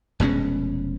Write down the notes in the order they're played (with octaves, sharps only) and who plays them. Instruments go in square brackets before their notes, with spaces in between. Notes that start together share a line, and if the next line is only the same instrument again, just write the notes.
[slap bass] F1 B2 G#3 C#4